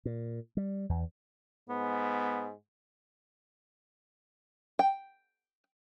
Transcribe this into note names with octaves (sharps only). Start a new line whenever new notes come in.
A#2
G3
E2
G#2 B3
G5